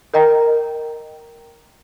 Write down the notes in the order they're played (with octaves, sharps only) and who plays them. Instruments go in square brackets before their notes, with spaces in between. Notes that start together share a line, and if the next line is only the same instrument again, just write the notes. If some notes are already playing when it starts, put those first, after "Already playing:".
[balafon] A#4 D#5 G5 A#5